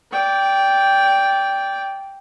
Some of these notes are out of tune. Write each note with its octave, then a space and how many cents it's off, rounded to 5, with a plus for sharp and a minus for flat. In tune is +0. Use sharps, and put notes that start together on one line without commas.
D5 -20 G5 +0